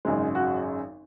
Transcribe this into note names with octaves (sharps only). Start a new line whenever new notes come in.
G#1 F#2 C#3 G#3
F#4